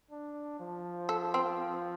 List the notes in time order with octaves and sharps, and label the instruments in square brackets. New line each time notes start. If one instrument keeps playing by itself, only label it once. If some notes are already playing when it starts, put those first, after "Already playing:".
[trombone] D4
F3
[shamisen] A4
C4